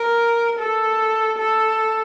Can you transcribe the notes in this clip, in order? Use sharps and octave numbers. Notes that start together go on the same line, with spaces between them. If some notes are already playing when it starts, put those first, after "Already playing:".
Already playing: A#4
A4
A4